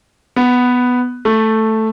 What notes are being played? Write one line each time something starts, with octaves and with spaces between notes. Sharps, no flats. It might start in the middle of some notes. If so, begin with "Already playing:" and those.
B3
A3